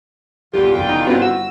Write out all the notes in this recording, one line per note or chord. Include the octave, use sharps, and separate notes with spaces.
D#1 E2 A2 D3 F4 G4
F1 D#2 G5
D#4
G1 F#3 B3 C4
F#4 E6